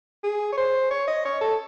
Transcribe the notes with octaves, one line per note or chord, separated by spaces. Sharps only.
G#4
C#5
C5
C#5
D#5
C#5
A4